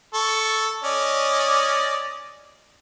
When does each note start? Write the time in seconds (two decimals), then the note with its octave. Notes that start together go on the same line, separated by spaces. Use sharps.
0.14 A4 C#6
0.84 C#4 D5 D#5